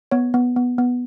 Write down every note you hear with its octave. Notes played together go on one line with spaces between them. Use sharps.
B3 C#5
B3
B3
B3